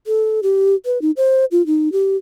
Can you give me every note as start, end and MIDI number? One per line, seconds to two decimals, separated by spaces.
0.07 0.40 69
0.43 0.75 67
0.86 1.01 71
1.02 1.11 63
1.17 1.45 72
1.52 1.65 65
1.66 1.91 63
1.92 2.16 67